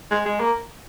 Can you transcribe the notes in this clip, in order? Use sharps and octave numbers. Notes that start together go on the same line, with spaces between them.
G#3
G#3
A#3